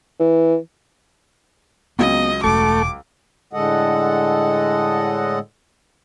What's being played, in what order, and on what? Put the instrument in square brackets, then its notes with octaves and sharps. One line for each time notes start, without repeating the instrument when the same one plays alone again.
[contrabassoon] E3
[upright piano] C#2 F#3 [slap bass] B3 C4 [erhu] D#5
[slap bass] E1 [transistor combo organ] A3 [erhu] D6
[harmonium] A2 D3 G#3 A4 D#5 F#5